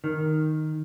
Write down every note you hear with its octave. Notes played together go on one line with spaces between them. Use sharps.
D#3